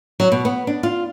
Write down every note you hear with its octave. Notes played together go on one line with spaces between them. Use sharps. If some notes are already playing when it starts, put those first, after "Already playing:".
F#3
B2
B3
D4
F4